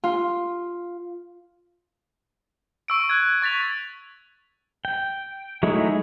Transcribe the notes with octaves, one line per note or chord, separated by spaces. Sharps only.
F4
C#6 E6 D7
F#6 G#6
C#6 A6 B6 F7
G5
F#3 G#3 A3 D#4 E4